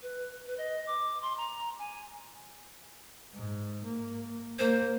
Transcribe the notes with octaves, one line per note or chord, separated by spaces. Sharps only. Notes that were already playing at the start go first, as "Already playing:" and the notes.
B4
B4
D#5
D6
C6
A#5
G#5
G#2
A#3
A#3 C5